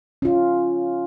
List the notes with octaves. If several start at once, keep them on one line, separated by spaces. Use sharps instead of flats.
C#4 F4